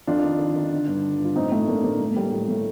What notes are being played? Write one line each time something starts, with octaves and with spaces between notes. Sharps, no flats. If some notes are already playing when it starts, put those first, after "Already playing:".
F2 D4 F4
D#3
D#3
D#3
D3
G2
D3
G2 F4
A2 C4 D#4
A2 A3 C4
A2 A#3 D4
A2 A#3 D4
A2 A3
A3
A2 G3 A#3
A2 G3
A2 A3